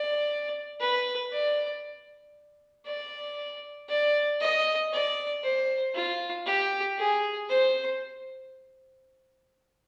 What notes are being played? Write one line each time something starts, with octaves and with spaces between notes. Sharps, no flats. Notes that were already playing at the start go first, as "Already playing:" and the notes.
Already playing: D5
B4
D5
D5
D5
D#5
D5
C5
F4
G4
G#4
C5